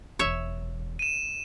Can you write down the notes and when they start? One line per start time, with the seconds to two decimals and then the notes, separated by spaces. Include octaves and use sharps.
0.19 E1 E3 C#5 E5
0.99 D#7 E7